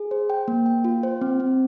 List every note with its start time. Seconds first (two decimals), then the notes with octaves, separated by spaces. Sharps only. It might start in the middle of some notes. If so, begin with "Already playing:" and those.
Already playing: G#4
0.11 C5
0.30 G5
0.48 A#3
0.66 G5
0.84 F4
1.03 C5
1.21 C4
1.40 C4